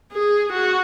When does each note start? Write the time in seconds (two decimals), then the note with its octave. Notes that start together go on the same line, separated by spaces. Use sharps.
0.12 G#4
0.53 F#4